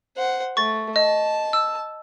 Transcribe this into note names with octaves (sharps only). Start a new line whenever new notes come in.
C5 F#5
A3 C#6 A6
D#5 A5
E6